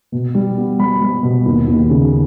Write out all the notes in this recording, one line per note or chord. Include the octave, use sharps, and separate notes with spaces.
B2
G3
B3
G3 B5
G3
B2
D#2
D#2
C#3